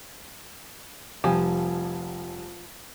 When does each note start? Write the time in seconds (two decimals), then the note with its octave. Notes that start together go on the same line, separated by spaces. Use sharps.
1.24 F1 F3 G3 G#5